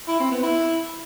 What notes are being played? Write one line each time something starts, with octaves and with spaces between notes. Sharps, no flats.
E4
C4
B3
E4